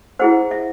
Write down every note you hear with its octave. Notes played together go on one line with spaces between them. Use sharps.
E4 G#4 C5 F#5
E5